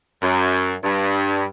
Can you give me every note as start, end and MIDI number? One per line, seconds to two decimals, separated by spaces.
0.22 0.73 42
0.83 1.44 43